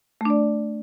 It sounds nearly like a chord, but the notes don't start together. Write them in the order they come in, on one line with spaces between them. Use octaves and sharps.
A3 D4 D5